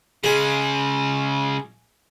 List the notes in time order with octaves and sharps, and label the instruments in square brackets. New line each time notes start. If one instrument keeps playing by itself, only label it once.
[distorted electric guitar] C#3 G#3 [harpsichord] G#4